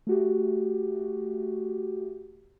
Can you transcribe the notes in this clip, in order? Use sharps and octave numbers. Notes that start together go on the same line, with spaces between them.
A3 F#4 G4